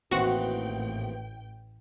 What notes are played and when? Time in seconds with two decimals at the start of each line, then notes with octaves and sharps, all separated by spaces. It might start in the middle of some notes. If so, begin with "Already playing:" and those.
0.11 A1 D#2 E3 C4 F#4 F#5 G5